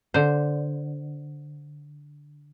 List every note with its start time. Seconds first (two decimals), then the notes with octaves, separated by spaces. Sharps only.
0.14 D3 C5